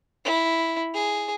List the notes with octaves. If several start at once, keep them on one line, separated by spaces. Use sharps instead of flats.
E4
G#4